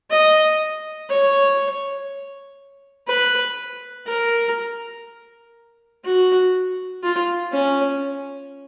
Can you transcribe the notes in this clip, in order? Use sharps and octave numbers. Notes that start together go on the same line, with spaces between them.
D#5
C#5
B4
A#4
F#4
F4
C#4